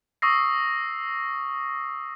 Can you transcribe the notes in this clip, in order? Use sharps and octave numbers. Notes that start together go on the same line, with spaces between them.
C#6 D#6 E6 A#6 C7